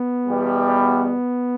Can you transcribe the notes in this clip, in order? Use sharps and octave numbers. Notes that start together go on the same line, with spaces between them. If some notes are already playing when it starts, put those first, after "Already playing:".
Already playing: B3
E2 B2 G3